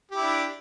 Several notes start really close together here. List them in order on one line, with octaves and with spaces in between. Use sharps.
G4 E4 D4